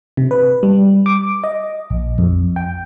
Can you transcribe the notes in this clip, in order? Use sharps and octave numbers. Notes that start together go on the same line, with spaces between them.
C3
B4
G3
D6
D#5
A#1
F2
G5